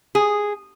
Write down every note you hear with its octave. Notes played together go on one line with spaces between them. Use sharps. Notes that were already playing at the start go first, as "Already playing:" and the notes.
G#4